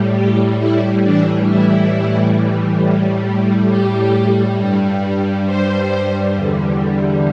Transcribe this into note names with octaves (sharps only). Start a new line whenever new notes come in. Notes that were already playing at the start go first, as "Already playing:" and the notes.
Already playing: A2 G3
G4
E4
A2 E3 G3 D4
E4
A2 G3
G4
G2 G3
C5
E2 D3 G3